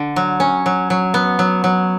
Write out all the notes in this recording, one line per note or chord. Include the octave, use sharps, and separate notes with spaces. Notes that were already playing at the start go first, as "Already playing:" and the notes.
Already playing: D3
F#3
C#4
F#3
F#3
B3
F#3
F#3